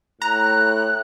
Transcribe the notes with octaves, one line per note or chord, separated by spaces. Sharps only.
A2 A#5 F#6